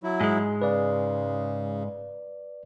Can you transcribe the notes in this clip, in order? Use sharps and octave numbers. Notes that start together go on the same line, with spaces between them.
F#3 E4
G#2 G#3
C#3 B4 D5